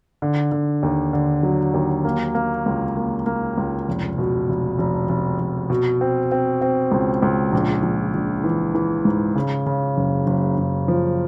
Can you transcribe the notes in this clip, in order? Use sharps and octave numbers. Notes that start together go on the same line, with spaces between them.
D3
D3
D#2
D3
F#3
D#2
A#3
A#3
C#2
A#3
A#3
C#2
F1
B2
F1
F1
F1
F1
B2
C4
C4
C4
C#2
C#2
A#1
A#1
A#1
E3
E3
G#2
C#3
C#3
F#1
F#1
F#1
F3